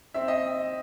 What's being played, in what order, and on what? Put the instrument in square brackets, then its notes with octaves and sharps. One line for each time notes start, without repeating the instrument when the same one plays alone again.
[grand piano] C4 E5
D#5